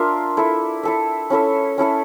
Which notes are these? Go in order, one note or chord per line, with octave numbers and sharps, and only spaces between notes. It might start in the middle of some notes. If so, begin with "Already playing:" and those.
Already playing: D4 F4 A#4 E5
E4 A4 E5
E4 A4 E5
C#4 E4 A4 E5
C#4 E4 A4 E5